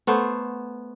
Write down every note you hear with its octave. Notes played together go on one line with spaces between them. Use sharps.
A3 B3 C5